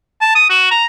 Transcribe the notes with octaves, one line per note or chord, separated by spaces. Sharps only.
A5
D#6
F#4
A#5